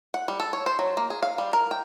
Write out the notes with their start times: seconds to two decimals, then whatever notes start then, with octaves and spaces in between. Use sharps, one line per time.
0.14 F#5
0.28 G3
0.40 A4
0.53 C#5
0.66 C5
0.79 F#3
0.97 A#3
1.10 G#4
1.23 F5
1.38 G3
1.53 A#4
1.71 G5